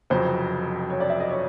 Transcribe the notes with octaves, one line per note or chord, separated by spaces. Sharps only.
F1 F2 C#3 F#3 C5
C#5
D5
E5
D#5
C#5